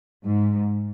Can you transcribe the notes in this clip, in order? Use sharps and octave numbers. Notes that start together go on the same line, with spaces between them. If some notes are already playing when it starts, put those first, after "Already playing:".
G#2